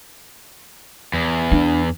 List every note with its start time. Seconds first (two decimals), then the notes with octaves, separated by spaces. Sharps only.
1.13 E2
1.52 D4